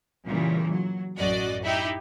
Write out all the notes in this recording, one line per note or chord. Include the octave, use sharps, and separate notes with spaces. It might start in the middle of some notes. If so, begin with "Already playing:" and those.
A#2 C#3 E3 G3
F#3
A1 F#2 F#4 D5 D#5
D#4 E4 G4